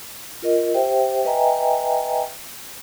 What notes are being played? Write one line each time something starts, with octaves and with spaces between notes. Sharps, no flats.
F4 A#4 D#5
G4 C5 E5 G5
B4 D#5 E5 G5 G#5 A#5